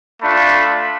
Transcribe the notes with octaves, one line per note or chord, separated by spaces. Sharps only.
A3 D4 F4 B5